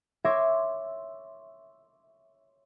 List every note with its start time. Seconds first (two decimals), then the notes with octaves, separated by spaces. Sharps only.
0.24 C#5 E5 C6 D6 G#6 A#6